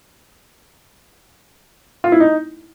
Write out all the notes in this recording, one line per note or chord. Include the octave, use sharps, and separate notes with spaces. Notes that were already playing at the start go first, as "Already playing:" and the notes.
F4
E4
D#4